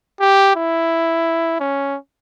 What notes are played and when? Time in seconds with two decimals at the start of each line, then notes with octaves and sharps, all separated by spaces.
0.21 G4
0.56 E4
1.60 C#4